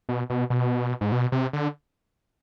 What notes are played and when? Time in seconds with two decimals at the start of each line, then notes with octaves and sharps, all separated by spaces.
0.09 B2
0.30 B2
0.50 B2
1.01 G#2
1.12 B2
1.32 C3
1.53 D3